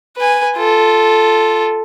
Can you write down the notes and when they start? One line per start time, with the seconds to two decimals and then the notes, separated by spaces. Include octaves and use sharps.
0.17 B4 G#5
0.57 F4 A4